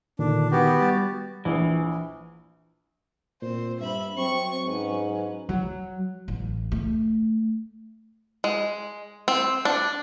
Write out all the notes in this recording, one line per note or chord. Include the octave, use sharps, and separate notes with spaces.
A#2 D3 D#3 D4
D#3 B3 F#4 G4
G3 A6
A#1 E3
A#2 C4 C5
G2 E5 B5
F#3 C4 C#6
G#2 C#4 B4
F#3
A1
A3
G#3
C4
D4